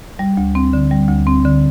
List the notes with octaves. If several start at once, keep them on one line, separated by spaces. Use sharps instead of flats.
G3
D2
C4
D3
G3
D2
C4
D3